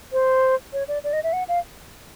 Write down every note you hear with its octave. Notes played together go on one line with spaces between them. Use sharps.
C5
C#5
D5
D5
D#5
E5
F#5
F5